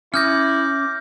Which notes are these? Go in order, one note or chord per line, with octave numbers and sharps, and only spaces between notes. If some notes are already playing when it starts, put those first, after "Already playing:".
C#4 E4 D6 D#6 F6 G6 A#6